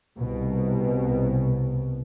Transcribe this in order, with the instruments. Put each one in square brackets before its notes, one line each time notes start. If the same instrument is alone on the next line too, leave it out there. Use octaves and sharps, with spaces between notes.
[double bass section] C2 B2